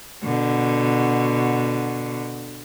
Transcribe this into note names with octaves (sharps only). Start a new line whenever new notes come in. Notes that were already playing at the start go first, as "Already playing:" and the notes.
B2 D3